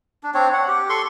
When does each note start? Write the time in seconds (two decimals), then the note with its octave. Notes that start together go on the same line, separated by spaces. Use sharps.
0.23 D4
0.34 C4 D4 C#5
0.53 F#5
0.68 G4
0.89 A4 C6 C#6